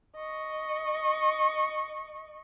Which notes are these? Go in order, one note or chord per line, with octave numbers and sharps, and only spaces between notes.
D#5 C#6